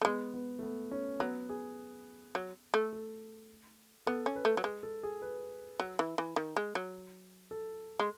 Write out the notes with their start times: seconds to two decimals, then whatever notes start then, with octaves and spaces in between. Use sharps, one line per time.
0.01 A3
0.05 G#3 B3
0.34 B3
0.59 A3
0.63 B3
0.91 C#4
1.20 F#3 B3
1.49 G#4
2.35 F#3
2.74 A3
2.93 A4
4.07 B3 A4
4.26 C#4
4.36 B4
4.45 A3
4.57 F#3
4.64 G#3
4.83 A4
5.03 G#4
5.22 B4
5.80 F#3
5.99 E3
6.18 E3
6.36 D#3
6.56 G#3
6.75 F#3
7.51 A4
7.99 G#3